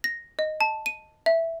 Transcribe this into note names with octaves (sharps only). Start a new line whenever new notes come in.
A#6
D#5
A5
D#7
E5